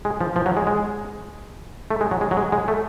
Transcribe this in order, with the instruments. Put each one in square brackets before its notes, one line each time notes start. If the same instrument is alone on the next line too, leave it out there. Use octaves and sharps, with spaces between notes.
[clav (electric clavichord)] G#3
F3
F3
F#3
G#3
G#3
A3
G#3
F#3
G#3
F#3
G#3
G#3
A3